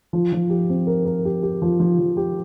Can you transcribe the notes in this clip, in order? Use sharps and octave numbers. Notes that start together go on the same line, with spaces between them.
F3
F3
G4
C4
A#4
A#4
G4
G4
F3
F3
F3
G4